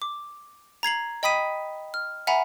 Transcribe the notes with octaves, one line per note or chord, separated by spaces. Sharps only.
D6
A#5 G#6 C7 F#7
D#5 G5 B5 D#6 B6 D#7
F6
E5 F#5 G#5 A#5 B5